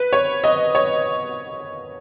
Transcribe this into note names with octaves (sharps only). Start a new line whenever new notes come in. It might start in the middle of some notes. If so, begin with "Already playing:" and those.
Already playing: B4
C#5
D#5
C#5